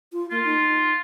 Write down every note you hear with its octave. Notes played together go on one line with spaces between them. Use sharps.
F4
A#3 F4
D#4